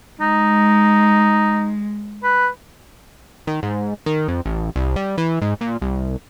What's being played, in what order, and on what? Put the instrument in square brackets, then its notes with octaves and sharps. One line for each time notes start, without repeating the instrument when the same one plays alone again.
[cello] G#3 [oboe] D#4
[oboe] B4
[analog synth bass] D#3
G#2
D#3
F2
A1
C2
G3
E3
G#2
A#2
C2